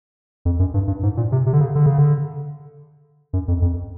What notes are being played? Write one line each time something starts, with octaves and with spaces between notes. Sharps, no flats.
F2
F#2
G2
G2
G#2
A#2
C3
C3
D3
C#3
D3
C#3
D3
F#2
F2
F2